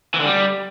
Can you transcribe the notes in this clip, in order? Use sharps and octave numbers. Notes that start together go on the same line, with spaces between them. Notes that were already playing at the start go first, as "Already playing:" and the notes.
E3
D3
G3